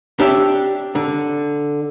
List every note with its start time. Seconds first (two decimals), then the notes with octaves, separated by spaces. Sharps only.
0.19 D4 G4 C#5 E5
0.95 D3